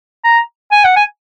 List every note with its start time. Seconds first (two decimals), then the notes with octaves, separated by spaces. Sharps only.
0.24 A#5
0.72 G#5
0.84 F#5
0.96 G#5